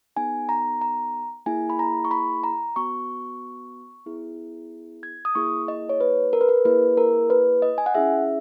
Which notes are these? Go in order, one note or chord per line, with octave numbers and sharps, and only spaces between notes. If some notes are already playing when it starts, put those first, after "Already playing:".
B3 D#4 G#4 G#5
A#5
A#5
A#3 E4 G#4 G#5
B5
A#5
C#6
B5
A#5
B3 F#4 C#6
B3 E4 G#4
G#6
D#6
A#3 E4 G#4 C#6
D#5
C#5
B4
A#4
B4
A#4
A#3 E4 G#4 B4
A#4
B4
D#5
G#5
F#5
C#4 E4 G#4 E5